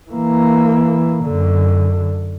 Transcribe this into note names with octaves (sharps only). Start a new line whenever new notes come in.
E3 A#3
F#2 D3